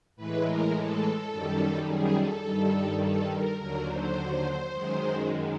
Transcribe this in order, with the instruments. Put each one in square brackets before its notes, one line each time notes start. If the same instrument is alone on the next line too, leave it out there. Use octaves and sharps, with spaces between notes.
[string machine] A2 E3 G#3 B4
A#4
A4
F#2 D#3 G3
G#4
A4
G2 D#3 G3
A4
A#4
D#2 D3 F#3 A#4
C5
F#2 D#3 G#3